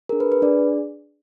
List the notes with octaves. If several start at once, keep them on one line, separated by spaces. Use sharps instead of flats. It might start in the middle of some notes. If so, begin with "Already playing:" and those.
D4 G#4 A#4
B4
B4
D4 G#4 D5